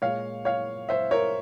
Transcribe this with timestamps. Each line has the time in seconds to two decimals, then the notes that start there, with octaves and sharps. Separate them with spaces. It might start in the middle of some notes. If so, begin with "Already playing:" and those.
0.02 A#2 G#3 C#5 F5
0.45 C#5 F5
0.89 C5 E5
1.11 A#4 C#5